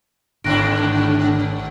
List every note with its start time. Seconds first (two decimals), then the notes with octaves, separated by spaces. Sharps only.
0.44 G#1 D#2 G#2 D3 D4 F#6 A#6 D7